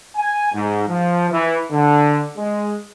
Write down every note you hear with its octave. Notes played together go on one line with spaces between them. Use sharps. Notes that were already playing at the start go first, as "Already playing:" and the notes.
G#5
G#2
F3
E3
D3
G#3